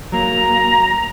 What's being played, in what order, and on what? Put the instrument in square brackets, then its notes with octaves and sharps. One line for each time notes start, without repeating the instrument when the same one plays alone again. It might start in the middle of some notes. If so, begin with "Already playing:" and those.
[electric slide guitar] F#3 A#3 [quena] A#5